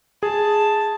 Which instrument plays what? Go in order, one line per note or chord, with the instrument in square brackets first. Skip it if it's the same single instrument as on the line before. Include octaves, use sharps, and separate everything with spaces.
[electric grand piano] G#4 [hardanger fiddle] A5